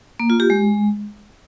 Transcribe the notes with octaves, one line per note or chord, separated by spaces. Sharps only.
A#3
F4
G4
G#3